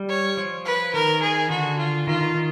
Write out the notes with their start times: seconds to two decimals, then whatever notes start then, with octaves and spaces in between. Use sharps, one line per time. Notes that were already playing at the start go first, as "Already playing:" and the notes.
Already playing: G3
0.09 C#5
0.37 F3
0.65 B4
0.94 D#3 A#4
1.22 G#4
1.50 D3 F#4
1.78 F4
2.07 D#3 F4
2.21 D#3
2.35 D#3